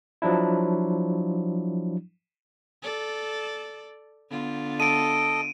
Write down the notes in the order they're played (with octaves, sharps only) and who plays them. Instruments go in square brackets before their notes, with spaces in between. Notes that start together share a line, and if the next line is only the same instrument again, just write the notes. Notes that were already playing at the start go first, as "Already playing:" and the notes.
[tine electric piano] F3 F#3 D4 E4
[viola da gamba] A4 D5
D3 B3 F4
[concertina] A4 D#5 [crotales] D7 D#7